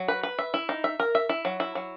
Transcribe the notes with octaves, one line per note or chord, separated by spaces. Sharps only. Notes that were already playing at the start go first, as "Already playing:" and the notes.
Already playing: F#3
B4
B4
E5
E4
D#4
E5
A#4
E5
E4
F#3
E4
F#3